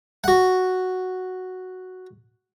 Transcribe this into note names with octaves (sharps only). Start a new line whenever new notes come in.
F#4 F#5